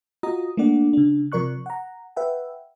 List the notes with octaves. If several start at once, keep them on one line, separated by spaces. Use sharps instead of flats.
F4 F#4 D#5 A#5 D#6
A3 A#3 D4 D5 F#5
C#3 D4
C3 F3 A#4 D5 C#6 F#6
F#5 A#5
B4 E5 F#5 G5